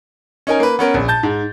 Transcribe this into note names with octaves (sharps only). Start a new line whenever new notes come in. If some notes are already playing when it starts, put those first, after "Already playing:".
C#4 D#4 A#4 G#5
A#3 B4
B3 C#4 A#4
A#1
A5 G6 A6
G#2